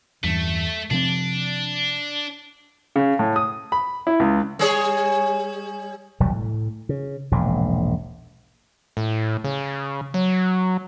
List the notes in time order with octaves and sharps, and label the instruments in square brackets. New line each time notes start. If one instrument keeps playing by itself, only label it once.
[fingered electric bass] E2 G2 [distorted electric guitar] A3
[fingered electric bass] C3 F3 C4 [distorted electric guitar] D4
[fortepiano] C#3
A2
D#6
B5
E4
C#2
[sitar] G3 G#4 C#5
[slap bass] E1 C2 F#3 G3
A2
C#3
E1 A#1 G#2
[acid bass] A2
C#3
F#3